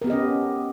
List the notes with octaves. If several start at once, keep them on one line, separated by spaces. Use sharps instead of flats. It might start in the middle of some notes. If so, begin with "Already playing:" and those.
B3 C#4 G4 A#4 D#5